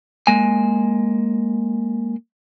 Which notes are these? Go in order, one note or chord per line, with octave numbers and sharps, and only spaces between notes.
G#3 A#3 G#5